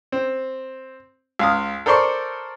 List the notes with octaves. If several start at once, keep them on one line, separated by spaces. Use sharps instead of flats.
C4
C#2 F5 D#6
A4 A#4 C5 D5 C6 C#6